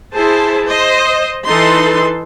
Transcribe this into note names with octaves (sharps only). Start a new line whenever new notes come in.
E4 G#4 C5 A5
C5 D#5
E3 D#4 A4 B4 C6